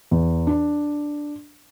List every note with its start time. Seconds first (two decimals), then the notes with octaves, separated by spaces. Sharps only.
0.11 E2
0.47 D4